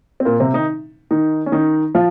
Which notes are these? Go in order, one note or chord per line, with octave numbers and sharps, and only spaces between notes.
C4
A#2 A#3
C3 C4
D#3 D#4
D#3 D#4
C#4
D#3 D#4
F3 F4